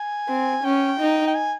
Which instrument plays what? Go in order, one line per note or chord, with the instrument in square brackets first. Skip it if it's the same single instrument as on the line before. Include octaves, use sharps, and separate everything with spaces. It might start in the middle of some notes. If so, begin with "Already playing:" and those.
Already playing: [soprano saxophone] G#5
[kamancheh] C4
[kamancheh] C#4 [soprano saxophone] G5
[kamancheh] D#4
[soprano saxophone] G5
G#5